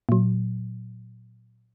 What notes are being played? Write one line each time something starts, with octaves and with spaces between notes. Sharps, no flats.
A#2 F#3